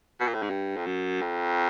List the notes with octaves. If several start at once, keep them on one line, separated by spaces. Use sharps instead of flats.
B2
A#2
A2
G#2
G2
F2
F#2
F2